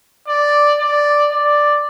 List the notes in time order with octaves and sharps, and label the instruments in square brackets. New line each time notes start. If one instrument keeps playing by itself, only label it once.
[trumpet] D5
D5
D5